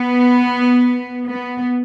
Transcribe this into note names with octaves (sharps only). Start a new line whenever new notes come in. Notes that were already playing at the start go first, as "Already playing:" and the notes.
Already playing: B3
B3